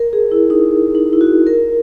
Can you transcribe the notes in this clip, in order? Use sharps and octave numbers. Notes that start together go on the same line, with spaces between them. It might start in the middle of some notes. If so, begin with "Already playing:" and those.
Already playing: A#4
G#4
E4
D#4
D#4
E4
F#4
A#4